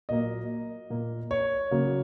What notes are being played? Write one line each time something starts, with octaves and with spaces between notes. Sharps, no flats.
A#2 F#3 A#3 D#5
A#2 A#3
C#5
C#3 F#3 A#3